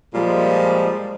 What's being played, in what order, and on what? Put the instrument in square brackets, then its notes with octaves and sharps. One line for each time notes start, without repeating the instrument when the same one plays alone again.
[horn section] A#2 F3 G3 G#3